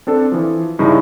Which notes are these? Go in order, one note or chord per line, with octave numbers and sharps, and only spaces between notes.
C4 D4 A4
E3 F3
G2 C#3 D#4 E4